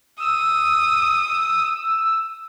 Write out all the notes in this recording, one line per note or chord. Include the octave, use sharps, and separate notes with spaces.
D#6 E6